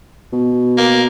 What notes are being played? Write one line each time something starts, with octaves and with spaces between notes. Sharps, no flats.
B2
A#3